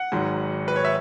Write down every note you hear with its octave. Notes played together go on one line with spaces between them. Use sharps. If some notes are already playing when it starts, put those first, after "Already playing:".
Already playing: F#5
G#1 G#2 F#3
B4
C#5
E5